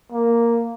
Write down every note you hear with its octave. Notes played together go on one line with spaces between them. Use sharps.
A#3